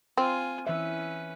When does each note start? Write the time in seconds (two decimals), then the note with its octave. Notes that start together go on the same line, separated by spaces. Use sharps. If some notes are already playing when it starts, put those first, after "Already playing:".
0.17 C4 F4 G#5
0.67 E3 C#4 B4 E5